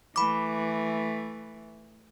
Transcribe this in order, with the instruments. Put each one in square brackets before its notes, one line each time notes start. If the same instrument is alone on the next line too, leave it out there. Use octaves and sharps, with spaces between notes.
[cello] E3 A3 [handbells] B5 D6